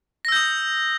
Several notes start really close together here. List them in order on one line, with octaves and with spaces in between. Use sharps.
A#6 E6 G6 D#6